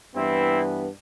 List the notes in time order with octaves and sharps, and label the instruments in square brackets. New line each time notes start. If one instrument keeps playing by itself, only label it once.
[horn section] G2 E3 B3 C4 E4